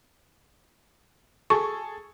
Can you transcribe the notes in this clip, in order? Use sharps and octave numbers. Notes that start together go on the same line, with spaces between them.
G#4 A4 C#6